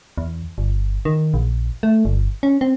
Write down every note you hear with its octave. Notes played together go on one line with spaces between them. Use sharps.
E2
G1
D#3
A#1
A3
G1
C#4
C4